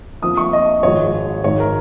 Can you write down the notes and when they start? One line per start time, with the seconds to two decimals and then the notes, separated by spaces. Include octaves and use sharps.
0.22 F2 F3 A#3 D#6
0.37 C#6
0.53 D#5
0.83 G#1 G#2 F3 G#3 C#5
1.44 G#1 G#2 D#3 G#3 C#5
1.60 A#4